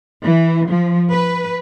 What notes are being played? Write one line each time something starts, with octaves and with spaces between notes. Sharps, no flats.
E3
F3
B4